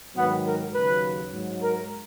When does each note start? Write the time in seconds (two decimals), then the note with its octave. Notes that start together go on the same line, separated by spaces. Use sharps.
0.15 G#2 D#3 F#3 B3
0.45 A#4
0.74 D#2 C#3 F#3 B4
1.33 G#2 F#3
1.62 A#4